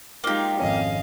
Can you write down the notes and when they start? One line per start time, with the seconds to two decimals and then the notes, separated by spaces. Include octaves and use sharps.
0.24 G#3 A#3 D#4 F4 G4
0.60 G#1 F2 C#4 D#5 F5